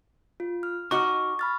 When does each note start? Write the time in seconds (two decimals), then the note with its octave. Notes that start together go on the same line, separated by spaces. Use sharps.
0.40 F4
0.63 F6
0.91 D#4 F#4 C#6 D6 F6
1.39 B5 F6 A6